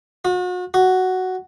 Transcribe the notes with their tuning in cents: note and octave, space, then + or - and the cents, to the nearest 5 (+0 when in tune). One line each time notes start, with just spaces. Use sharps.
F#4 -40
F#4 +5